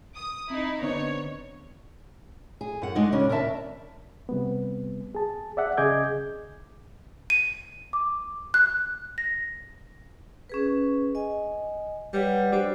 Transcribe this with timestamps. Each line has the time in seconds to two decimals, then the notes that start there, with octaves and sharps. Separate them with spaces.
0.17 D#6
0.50 C4 D#4 E4
0.82 D3 B3 C4 D4 C#5 D#5 C#6
2.61 G#4
2.82 F#2 F#5
2.95 G#3 D4 D#4 F#4 D#5
3.12 C#3 C#4 D4
3.29 D#2 A#4 D5 E5 A5
4.29 C3 G3 B3
5.15 G#4 A5
5.57 D5 E5 F#5
5.77 C#3 G#4 D#5 D6 G6 G#6
7.30 D#7
7.93 D6
8.54 F#6
9.18 A#6
10.50 C#4 G#4 B4
11.15 D#5 G#5
12.14 G3 B4 C#5 F#5
12.52 G3 D4 F#4 C5